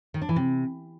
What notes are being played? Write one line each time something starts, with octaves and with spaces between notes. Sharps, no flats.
D#3
D4
E3
C3